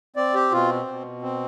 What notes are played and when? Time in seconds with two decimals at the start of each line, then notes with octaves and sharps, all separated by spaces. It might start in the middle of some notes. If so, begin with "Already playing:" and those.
0.16 C4 D5
0.34 G4
0.52 B2 F4
0.87 B2
1.22 C4